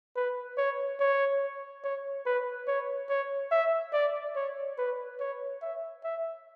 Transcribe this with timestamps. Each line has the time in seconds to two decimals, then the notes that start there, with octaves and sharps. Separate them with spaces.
0.16 B4
0.58 C#5
1.00 C#5
1.84 C#5
2.26 B4
2.67 C#5
3.10 C#5
3.52 E5
3.93 D5
4.36 C#5
4.78 B4
5.20 C#5
5.62 E5
6.04 E5